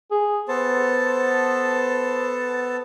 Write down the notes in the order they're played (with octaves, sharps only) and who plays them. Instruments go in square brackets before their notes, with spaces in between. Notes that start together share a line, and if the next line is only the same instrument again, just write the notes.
[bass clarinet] G#4
[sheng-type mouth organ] B3 A4 A5 [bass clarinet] C5